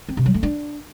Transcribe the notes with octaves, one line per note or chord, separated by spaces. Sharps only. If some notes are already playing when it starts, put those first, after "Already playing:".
C4
C3
F#3
A3
D4